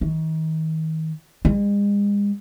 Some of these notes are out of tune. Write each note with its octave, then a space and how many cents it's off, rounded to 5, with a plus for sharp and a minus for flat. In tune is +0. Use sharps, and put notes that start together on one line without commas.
D#3 +35
G#3 -40